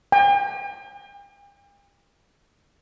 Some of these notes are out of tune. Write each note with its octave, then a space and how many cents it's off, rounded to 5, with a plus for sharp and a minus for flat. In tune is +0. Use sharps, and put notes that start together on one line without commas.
G5 +45